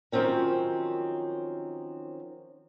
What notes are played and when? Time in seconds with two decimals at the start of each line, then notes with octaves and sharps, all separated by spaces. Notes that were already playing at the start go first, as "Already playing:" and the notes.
0.12 D#3 F3 F#3 C4 C#4